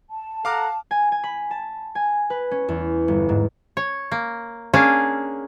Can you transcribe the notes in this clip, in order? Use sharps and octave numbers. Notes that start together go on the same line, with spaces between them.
A5
A4 F5 F#5 A#5 D6 F6
G#5
G#5
B5
A5
G#5
B4
C#4
E2
G1
G#2
C#5
A#3
A#3 C#4 D4 G#4 F5